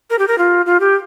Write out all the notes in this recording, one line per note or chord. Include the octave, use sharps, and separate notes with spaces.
A#4
G4
A#4
F4
F4
G4